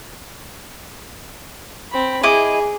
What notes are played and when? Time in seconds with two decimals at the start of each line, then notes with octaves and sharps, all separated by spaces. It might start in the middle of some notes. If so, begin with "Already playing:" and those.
1.92 C4 B5
2.23 E4 G#4 D#5 D6